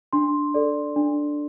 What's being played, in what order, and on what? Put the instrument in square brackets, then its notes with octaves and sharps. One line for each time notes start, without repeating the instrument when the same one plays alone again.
[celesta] D4 C6
A4 D5
D4